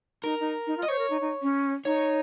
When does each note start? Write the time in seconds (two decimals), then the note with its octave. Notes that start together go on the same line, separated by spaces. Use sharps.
0.23 D#4 A#4
0.40 D#4
0.67 D#4
0.77 F4
0.83 D#5
0.88 C5 C#5
0.99 A#4
1.10 D#4
1.21 D#4
1.42 C#4
1.85 D#4 C#5